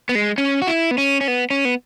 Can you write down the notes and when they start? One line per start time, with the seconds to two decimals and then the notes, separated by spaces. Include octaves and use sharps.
0.09 B3
0.15 G#3
0.38 C#4
0.62 F#4
0.67 E4
0.91 B3
0.98 C#4
1.21 C#4
1.28 B3
1.50 C#4
1.65 B3